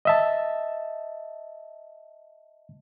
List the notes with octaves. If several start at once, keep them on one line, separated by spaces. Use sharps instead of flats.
D#5 E5 A5